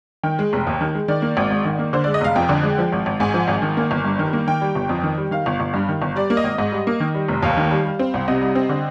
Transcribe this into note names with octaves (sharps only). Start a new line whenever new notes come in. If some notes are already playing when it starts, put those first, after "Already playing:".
D#3 G5
G#3
F1
D#2
D#3
G#3
D#3 D5
A#3
G#1
G#2
D#3
A#3
D3 C5
G#3 D5
D#5
F1 F5
F2 G5
D3
G#3
F3
G#1
G#1
G#2 G#5
F3
G#1
D#3
A#3
G1
G2
D#3
A#3
D#3 G5
G3
G1
F2
D#3
G3
D#3 F5
G1
G1
G2
D#3
G1
G3 D5
A#3
D#5
G#1
G#2 D#5
G3
A#3
D#3
G3
F1
D#2 F5
D#3
G3
G3
C4
C2
C3 D#5
G3
C4
D3